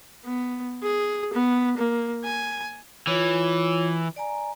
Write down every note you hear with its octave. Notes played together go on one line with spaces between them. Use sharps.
B3
G#4
B3
A#3
G#5
E3 F4 C#5
D5 G#5 A#5